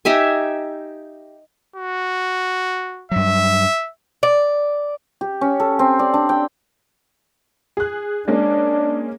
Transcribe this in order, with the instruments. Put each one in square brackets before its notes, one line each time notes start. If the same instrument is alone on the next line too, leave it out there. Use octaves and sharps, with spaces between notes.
[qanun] D#4 G4 E5 G#5
[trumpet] F#4
[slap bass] G2 F#3 [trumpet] E5
[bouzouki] D5
[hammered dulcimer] G4
C#4
A4
C4
D5
D4
G5
[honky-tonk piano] G#4 F#6
[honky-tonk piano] G#3 A#3 C#4 [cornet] D4